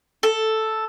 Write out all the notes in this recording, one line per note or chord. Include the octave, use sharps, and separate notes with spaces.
A4